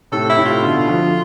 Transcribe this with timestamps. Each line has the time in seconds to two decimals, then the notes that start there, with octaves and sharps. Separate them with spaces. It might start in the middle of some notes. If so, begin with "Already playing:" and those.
0.12 A2 C3 A4
0.29 E4
0.37 A2 C3
0.45 F4
0.62 B2 D3
0.87 D3 F3